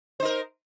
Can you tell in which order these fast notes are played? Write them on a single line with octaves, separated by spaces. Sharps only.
C5 D#4 A#4